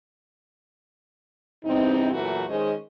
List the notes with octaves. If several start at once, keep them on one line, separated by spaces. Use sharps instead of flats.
E2 G2 C3 C4 D#4
E2 A#2 E3 F#3 A3 F#4
D#3 G#3 C#4 G#4 C5 D#5